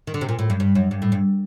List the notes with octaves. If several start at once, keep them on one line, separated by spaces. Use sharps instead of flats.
D#3
D3
C3
A#2
A2
G2
G2
F#2
G2
A2
G2